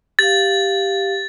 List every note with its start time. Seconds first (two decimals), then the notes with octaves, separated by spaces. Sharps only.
0.19 G4 F5 A6